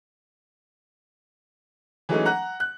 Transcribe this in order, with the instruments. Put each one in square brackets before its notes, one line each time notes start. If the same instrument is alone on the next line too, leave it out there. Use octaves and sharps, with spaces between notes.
[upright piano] E3 F#3 G#3 A3 C#4 D#4
F#5 A#5 F#6
F#6